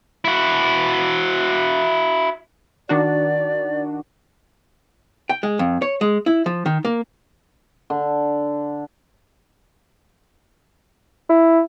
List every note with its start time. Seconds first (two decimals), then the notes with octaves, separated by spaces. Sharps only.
0.25 E4 F#4
2.89 D#3 D4 F#4 D5
5.29 G5
5.43 G#3
5.59 F2
5.82 C#5
6.01 G#3
6.26 E4
6.46 F3
6.66 D#3
6.85 A#3
7.90 D3
11.30 E4